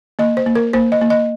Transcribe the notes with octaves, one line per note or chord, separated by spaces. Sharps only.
A#3 D#5
C5
A#3
A#4
A#3 C5
D#5
A#3
D#5